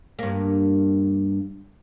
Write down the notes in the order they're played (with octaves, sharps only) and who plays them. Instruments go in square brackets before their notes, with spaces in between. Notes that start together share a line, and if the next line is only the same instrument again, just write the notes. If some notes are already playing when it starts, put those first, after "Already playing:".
[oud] G2 A#3